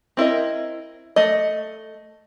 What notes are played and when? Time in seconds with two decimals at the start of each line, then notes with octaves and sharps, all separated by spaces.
0.17 C4 E4 A#4 D#5
1.16 A3 D#5